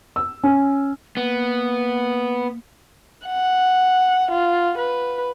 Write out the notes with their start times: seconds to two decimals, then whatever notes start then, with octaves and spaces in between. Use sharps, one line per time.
0.16 E6
0.43 C#4
1.17 A#3 B3
3.27 F#5
4.31 F4
4.78 B4